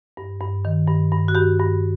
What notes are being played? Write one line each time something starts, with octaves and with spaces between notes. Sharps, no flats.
G2
G2
D#3
G2
G2
F#4
G2 G4
G2